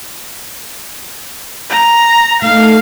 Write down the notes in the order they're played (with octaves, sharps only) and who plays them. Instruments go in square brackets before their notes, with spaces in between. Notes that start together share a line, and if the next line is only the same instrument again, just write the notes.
[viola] A#5
[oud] A3 D#4 A4 [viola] F5